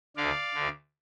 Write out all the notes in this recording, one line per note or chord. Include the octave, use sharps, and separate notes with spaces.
D2 D3 D5 F5
D2 D3